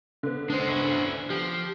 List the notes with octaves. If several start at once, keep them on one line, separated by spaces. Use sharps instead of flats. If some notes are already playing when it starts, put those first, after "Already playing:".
D3 B3
G#3 D4 C5
C#4 E4
F3 G4